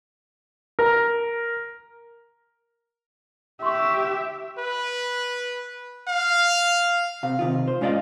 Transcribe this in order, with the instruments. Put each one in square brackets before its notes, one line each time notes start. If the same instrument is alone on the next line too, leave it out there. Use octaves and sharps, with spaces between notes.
[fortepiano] A#4
[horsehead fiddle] G4 E5 [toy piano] C6 C#6
[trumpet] B4
F5
[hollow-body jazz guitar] C3 F5
C3 D#3 F4
C5
G#2 C#4 F4 D5 D#5 F5